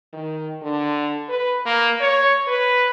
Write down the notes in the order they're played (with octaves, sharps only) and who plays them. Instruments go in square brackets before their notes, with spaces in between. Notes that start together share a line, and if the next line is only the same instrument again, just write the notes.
[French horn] D#3
D3
B4
A#3
C#5
B4